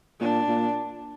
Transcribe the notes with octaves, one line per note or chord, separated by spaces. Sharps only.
A#2 D4
A#2